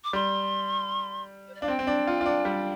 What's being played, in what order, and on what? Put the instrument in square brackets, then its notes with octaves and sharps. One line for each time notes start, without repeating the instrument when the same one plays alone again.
[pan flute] D6
[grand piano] G3 [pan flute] C6
[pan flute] C5
D5
[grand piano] D4 [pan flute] F5
[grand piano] C4 [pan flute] G5
[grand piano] C4
D4
F4
F4
D4
G3